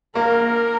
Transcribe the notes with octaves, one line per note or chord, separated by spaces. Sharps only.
A#3 A#4